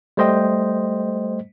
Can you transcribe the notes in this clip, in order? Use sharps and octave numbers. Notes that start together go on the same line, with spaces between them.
G3 A3 C5 D#5 G5